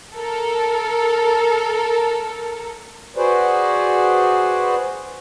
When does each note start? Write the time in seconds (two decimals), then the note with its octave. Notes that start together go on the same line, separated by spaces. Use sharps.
0.14 A4 A#4
3.16 F#4 G#4 B4 C5 D5